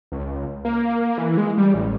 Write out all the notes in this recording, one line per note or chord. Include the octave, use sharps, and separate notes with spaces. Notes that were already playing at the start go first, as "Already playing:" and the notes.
C#2
A#3
E3
G#3
G3
A1